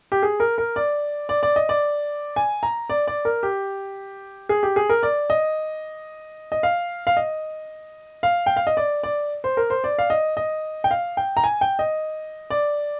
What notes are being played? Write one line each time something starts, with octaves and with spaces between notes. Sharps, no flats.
G4
G#4
A#4
A#4
D5
D5
D5
D#5
D5
G#5
A#5
D5
D5
A#4
G4
G#4
G4
G#4
A#4
D5
D#5
D#5
F5
F5
D#5
F5
G5
F5
D#5
D5
D5
C5
A#4
C5
D5
F5
D#5
D#5
G5
F5
G5
A#5
G#5
G5
D#5
D5